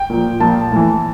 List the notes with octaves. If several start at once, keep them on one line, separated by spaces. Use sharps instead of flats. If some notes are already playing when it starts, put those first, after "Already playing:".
Already playing: G5
A#2 F3
A#2 F3 A5
A2 E3